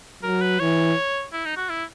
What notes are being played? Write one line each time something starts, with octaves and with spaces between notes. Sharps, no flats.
F#3 A#4
B4
E3 C#5
E4
D#4
F#4
E4